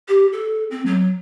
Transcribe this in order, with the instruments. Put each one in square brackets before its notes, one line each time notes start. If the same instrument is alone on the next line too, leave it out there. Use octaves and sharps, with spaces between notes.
[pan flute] G4
A4
C4
F#3